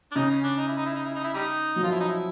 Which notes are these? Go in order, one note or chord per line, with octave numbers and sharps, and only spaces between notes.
D4
C#3 D#4
C#4
D4
D#4
E4
D#4
E4
D#4
E4
D#4
E4
G3 D#4
F#3
F3 F4
E4
D#4
E4